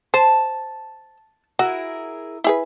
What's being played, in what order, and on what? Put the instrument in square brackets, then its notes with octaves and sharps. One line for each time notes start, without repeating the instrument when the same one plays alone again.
[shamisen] C5 [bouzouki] A5
[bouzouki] E4 G#4 A#4 [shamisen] F#4
[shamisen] E4 G#4 B4